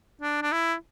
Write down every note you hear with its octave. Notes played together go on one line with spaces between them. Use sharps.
D4
D4
E4